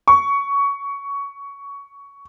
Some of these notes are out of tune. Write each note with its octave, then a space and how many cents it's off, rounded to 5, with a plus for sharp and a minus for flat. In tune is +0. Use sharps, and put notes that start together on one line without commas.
C#6 +15